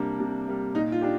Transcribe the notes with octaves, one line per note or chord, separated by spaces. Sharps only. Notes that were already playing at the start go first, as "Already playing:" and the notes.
Already playing: C3 G3 A#3 D4
C3
G3 A#3
A#2 D#4
F4
D4 G4